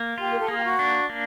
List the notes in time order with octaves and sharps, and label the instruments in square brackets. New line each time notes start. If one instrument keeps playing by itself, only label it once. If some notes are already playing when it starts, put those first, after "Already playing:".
Already playing: [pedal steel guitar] A#3
[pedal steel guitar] F4 [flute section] G4
[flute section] A#4
A4
[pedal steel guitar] A#3 [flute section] G#4
[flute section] G4
F#4
[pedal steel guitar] D4
A#3